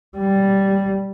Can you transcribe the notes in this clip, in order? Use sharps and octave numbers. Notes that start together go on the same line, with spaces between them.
G3